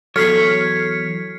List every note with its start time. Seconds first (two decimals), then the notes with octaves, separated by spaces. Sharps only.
0.16 E2 F#3 A4 C#5 F6 B6 C7